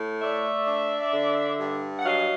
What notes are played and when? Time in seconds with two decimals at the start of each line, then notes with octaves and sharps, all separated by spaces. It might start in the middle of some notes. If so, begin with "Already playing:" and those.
Already playing: A2
0.22 A3 D5 E5
0.68 D4
1.14 D3
1.60 G2
1.98 F#5
2.06 F#3 D#5 F5